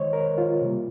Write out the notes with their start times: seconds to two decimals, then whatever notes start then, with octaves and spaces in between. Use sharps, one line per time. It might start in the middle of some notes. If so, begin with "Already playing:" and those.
Already playing: D#3 G#3 C5 C#5 D#5
0.13 A#4
0.38 F4
0.62 C3 G3 A#3